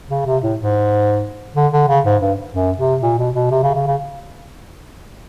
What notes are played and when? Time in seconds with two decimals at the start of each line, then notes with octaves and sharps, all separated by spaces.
0.10 C#3
0.26 C3
0.43 A2
0.59 G#2
1.56 D3
1.72 D3
1.88 C#3
2.05 G#2
2.21 G2
2.53 F#2
2.78 C3
3.02 A#2
3.18 B2
3.35 B2
3.51 C3
3.63 C#3
3.75 C#3
3.87 C#3